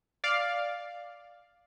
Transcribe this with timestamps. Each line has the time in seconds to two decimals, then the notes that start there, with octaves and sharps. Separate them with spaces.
0.24 D5 F5